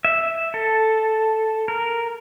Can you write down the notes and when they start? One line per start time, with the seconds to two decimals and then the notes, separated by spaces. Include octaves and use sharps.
0.05 E5
0.54 A4
1.68 A#4